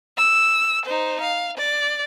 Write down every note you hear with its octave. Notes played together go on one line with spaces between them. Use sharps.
E6
D#4 C5
F5
D5